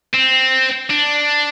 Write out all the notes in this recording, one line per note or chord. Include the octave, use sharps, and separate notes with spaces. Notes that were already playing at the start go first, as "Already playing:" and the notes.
C4
D4